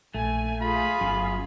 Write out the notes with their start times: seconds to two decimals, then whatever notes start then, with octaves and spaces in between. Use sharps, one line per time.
0.14 A#1 A3 G#5
0.61 F4 G#4 B5
1.01 G1 F#2